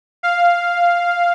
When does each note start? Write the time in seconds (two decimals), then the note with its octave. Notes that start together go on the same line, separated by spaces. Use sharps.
0.23 F5